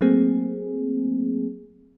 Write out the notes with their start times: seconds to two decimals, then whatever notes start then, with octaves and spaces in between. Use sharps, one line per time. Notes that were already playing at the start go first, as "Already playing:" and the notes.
0.01 F#3 A3 A#3 C4 G#4